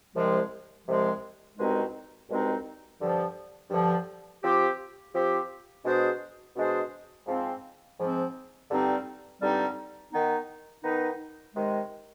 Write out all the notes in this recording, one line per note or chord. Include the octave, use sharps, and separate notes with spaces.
C2 C3 F3 G#3
C2 C3 F3 G#3
C2 B2 G#3 C4 D#4
C2 B2 G#3 C4 D#4
G2 D3 F3
G2 D3 F3
F3 C4 G4
F3 C4 G4
B2 G#3 D4 G#4 C5
B2 G#3 D4 G#4 C5
G#2 F3 C4
G#2 F3 C4
G2 D3 G3 C4 D#4
G2 D3 G3 C4 D#4
D#3 B3 D#4
D#3 B3 D#4
C3 D#3 G#3